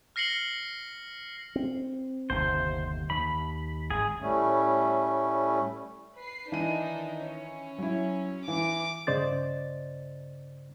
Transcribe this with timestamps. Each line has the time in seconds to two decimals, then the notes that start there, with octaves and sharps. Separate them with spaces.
0.16 F6 A#6 C7 C#7 F#7 G7
1.56 C4
2.30 G1 D#2 C3 C5
3.10 D#2 B5
3.91 G#1 G#4
4.20 A2 G3 A3 C#4
6.18 B4 C7
6.52 D#3 E3 D4 D#4 D#7
7.22 C#4
7.78 F#3 E4
8.48 E3 D6
9.07 G2 C#3 C5 D5 D#5 A6